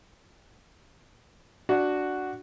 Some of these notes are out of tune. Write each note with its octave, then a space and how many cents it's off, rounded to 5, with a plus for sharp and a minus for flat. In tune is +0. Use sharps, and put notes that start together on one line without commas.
D4 +0 F#4 +0